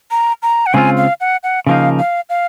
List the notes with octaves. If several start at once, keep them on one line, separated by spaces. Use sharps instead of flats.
A#5
A#5
F#5
C#3 G#3 C4 F4 G#5
F5
F#5
F#5
C#3 F3 A#3 D#4 F5
F5
F5